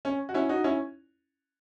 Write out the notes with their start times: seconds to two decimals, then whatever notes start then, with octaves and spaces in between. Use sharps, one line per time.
0.05 C#4
0.29 F#4
0.34 C#4 E4
0.49 D#4 F#4
0.64 C#4 E4